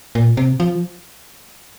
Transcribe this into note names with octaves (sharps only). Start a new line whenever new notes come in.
A#2
C3
F3